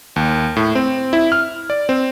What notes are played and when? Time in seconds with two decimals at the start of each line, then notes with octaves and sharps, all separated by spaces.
0.16 D#2
0.56 A2
0.75 C4
1.13 E4
1.32 F6
1.70 D5
1.89 C4